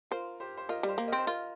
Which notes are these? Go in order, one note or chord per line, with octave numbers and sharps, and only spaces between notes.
F4 A#4 C5
G4 C5
C5
F4 A#4 D#5
G3
G4 C5
A#3
C4 A#4 D#5
C5
F4 A#4 D#5